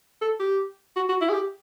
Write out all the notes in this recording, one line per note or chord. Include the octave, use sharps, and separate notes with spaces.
A4
G4
F#4
F#4
E4
G#4
G4